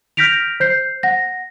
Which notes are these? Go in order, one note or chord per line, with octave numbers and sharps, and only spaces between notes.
F6 G6 A#6 B6 D7 F7
C5 G6 C7
F#5 A#6